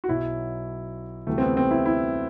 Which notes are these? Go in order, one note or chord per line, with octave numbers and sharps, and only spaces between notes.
F#4
B1 B2 F#3 E4
D2 C3 E3 G3 A3
C4
B3
C4
E4
E4